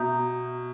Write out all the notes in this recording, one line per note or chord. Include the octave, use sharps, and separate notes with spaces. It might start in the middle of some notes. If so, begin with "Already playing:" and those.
Already playing: B2 E5 A#5 D#6 G6